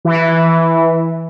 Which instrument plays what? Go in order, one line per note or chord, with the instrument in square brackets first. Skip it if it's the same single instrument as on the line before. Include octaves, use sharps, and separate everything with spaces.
[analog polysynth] E3